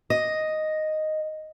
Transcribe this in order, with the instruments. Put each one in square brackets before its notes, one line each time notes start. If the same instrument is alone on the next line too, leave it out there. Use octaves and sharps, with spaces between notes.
[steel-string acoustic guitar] D#5